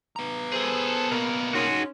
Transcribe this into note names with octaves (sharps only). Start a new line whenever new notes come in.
B3 A#5
G#4 A4 C5
B2 A#3 A#4
C#4 D#4 F#4 G#4 C6